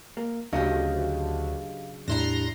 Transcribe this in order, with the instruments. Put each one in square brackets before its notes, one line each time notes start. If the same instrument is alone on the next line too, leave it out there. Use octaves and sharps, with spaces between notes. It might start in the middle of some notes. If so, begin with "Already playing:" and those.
[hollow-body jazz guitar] A#3
[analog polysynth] D2 [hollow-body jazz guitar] C#3 F#3 D4 [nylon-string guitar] G4 D#5 [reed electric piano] F5
[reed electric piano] E2 A2 E4 [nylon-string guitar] G3 D4 [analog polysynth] A#5 C6 A#6